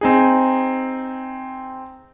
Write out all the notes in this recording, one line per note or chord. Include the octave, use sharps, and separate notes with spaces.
C4 D#4 G#4